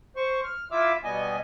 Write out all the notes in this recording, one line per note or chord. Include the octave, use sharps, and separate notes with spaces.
C5 C#6
F6
E4 F4 E5 D6 E6
B2 G3 B3 D#5 G#5